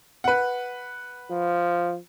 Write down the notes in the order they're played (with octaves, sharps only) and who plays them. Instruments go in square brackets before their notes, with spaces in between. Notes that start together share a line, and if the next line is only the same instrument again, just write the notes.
[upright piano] B4 F#5
[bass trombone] F3